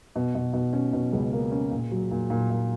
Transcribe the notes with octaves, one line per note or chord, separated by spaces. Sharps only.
B2
B2
B2
C#4
B2
C#2
A#3
C#4
A#2
F#3
A#2
A#2
A#2